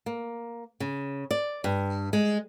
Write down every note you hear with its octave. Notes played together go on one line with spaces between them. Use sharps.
A#3
C#3
D5
G2
G#3